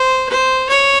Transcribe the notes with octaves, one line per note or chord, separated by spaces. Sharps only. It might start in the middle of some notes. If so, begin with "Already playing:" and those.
Already playing: C5
C5
C#5